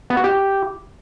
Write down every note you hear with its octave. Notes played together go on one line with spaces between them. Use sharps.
B3
F#4
G4